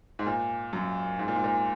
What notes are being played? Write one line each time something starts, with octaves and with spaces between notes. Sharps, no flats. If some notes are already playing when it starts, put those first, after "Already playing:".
G#2
A#2
F#2
G#2
A#2
G#2
A#2